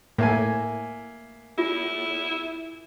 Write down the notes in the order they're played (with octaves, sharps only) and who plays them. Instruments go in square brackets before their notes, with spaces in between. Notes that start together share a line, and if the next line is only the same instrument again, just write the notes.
[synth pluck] A2 [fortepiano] A#3 E5 G#5
[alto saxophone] E4 [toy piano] F4